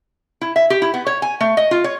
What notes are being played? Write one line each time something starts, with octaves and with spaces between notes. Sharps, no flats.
E4
E5
G4
E4
B3
C#5
G#5
A3
D#5
F4
C#5